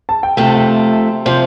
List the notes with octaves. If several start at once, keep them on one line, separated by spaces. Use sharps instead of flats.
A5
G5
C3 F3 A3 G5
A5
G5
C3 F3 C5